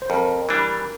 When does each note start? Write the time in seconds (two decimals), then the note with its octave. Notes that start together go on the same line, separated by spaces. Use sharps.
0.02 C5
0.10 F2 A#4
0.49 E3 G3 D4